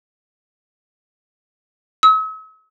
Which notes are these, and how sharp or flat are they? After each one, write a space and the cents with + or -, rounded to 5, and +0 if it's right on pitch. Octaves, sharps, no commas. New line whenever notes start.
E6 -45